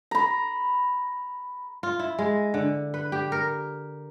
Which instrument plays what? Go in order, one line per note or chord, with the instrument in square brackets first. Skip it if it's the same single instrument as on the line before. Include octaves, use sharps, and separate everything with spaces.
[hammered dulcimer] A#5 B5
[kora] F4
E4
G#3
D3
B4
G4
A#4